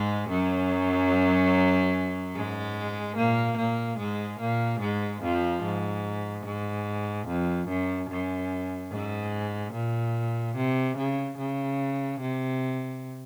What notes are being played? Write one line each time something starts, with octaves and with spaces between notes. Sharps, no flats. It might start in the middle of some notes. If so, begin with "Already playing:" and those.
Already playing: G#2 G#3
F#2 F#3
G#2 G#3
A#2 A#3
A#2 A#3
G#2 G#3
A#2 A#3
G#2 G#3
F2 F3
G#2
G#2
F2
F#2
F#2
G#2
A#2
C3
C#3
C#3
C3